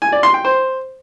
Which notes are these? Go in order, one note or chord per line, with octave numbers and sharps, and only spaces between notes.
G#5
D5
C6
G5
C5